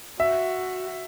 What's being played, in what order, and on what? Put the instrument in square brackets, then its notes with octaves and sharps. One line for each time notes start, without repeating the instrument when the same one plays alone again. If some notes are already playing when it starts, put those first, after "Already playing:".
[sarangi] F#4 [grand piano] E5